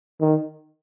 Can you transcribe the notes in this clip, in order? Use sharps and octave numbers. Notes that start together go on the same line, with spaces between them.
D#3